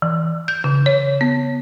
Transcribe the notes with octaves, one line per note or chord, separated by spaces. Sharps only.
E3
G6
C#3
C#5
B3